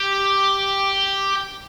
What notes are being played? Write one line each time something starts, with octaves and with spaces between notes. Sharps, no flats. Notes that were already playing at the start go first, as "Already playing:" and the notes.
Already playing: G4